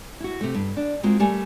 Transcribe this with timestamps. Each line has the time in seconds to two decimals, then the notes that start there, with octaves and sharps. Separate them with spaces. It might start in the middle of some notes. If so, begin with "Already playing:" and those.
0.20 E4 F#4
0.41 C3 A3
0.55 G2
0.77 D4
1.03 G#3 A#3 C4 F4 F#4
1.20 G3 A3 A#4 G#5